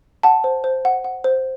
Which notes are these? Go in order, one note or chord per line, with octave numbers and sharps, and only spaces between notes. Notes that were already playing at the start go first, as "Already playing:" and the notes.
F#5 A5
C5
C5
F#5
F#5
C5